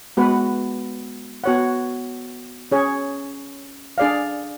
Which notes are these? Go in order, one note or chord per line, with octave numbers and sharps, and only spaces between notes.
G#3 B3 F#4 B4 F#5
B3 F#4 C#5 F#5
C#4 G#4 C#5
D4 G#4 D5 F5